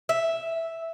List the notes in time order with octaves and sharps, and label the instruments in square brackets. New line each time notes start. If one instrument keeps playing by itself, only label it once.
[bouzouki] E5